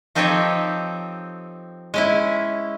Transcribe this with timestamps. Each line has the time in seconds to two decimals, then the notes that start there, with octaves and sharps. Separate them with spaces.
0.15 F3 C4 D#4 G4 A4 C#5
1.94 G#3 C#4 E4